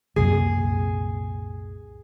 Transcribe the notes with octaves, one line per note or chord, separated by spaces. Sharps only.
C2 F#2 A#2 G#4